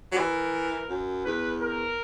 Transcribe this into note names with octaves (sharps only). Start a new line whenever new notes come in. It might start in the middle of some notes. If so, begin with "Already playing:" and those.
F#3
E3 A#4
F#2
E2 B4
A#4